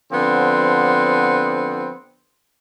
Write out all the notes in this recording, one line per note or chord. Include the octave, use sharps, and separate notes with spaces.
D3 F3 B3 C4